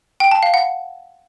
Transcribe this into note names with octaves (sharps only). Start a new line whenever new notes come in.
G5
A5
F5
F#5